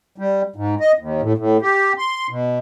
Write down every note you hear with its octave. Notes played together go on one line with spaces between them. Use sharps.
G3
G#2
D#5
D#2
A2
A2
G4
C6
B2